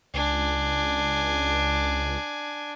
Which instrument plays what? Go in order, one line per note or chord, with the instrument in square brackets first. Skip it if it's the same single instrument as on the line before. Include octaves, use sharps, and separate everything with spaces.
[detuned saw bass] C#2 [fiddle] D4 G#5